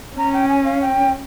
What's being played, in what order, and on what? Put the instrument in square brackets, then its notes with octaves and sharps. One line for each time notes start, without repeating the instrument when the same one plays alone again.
[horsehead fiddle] C#4 [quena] A#5
[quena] G5
G#5
F5
G5